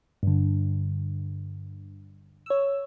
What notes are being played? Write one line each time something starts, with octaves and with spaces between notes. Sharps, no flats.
G2 D3
C#5 E6